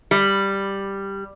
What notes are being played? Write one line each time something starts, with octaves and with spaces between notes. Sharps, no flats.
G3